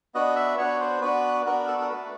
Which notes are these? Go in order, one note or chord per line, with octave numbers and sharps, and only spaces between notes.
B3 D4 F#4 D#5
E5
B3 D4 F#4 C#5
C5
B3 D4 F#4 B4
B3 D4 F#4 A#4
A4
A#4
A3 D4 F#4 B4